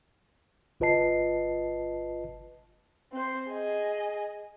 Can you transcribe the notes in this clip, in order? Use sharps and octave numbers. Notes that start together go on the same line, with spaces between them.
G1 F4 B4 D#5 A5 C7
C4 C5
G#4 D#5